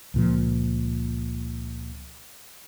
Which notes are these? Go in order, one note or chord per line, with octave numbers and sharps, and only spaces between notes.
C#2 A#2 F3